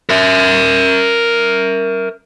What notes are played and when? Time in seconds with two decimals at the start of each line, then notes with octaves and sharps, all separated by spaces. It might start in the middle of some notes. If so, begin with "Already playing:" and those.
0.09 A#4 E5